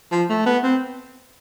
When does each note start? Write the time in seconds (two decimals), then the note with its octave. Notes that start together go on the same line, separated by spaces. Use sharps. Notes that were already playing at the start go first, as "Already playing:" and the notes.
0.12 F3
0.29 A3
0.46 B3
0.64 C4